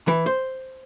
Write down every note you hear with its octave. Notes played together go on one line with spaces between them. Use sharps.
E3
C5